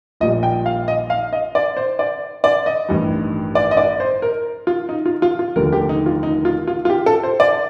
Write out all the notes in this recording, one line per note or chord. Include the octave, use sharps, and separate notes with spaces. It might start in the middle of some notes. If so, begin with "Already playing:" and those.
A#1 A#2 G3 D#5
G5
F5
D#5
F5
D#5
D5
C5
D5
D5
D#5
A1 G2 D#3 G3
D5
D#5
D5
C5
A#4
F4
D#4
F4
F4
F4
F1 D#2 D3 G3 A#4
G4
D#4
F4
D#4
F4
F4
F4
G4
A4
C5
D5